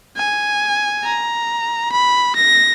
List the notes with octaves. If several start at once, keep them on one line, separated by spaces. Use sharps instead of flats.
G#5
A#5
B5
A#6